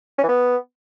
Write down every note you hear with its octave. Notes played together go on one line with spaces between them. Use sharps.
C#4
E3
B3